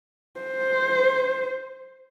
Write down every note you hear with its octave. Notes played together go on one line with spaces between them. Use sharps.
C5